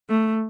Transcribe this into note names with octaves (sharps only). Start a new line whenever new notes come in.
A3